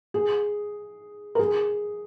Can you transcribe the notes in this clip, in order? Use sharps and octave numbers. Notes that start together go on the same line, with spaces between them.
G#4
A#4
G#4